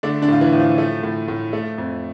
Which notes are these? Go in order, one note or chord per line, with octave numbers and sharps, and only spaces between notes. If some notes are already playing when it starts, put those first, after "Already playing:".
D3 A3 D4
D3 D4
A2 F4
E3 E4
A2
F3 F4
A3
A2
A2
A3
F2